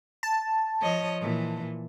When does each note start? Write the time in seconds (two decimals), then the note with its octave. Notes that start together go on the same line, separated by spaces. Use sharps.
0.23 A5
0.82 F3 C#5 D#5
1.20 A#2 E3